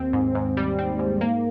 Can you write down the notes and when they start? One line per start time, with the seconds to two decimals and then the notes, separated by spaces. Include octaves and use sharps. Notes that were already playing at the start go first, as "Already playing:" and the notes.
Already playing: D#2 C4
0.13 G#2
0.35 G#2
0.57 G3
0.79 C4
0.99 G#2
1.21 A#3